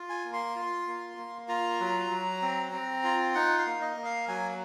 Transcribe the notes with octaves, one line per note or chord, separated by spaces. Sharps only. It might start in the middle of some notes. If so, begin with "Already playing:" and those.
Already playing: F4
G#5
A#3
C6
F4
A#3
A#3
F4 A#5
F#3
F#3
C4
C4
F4
D#4 F#5
F5
A#3
D#5
A#3
F5
F#3 G#5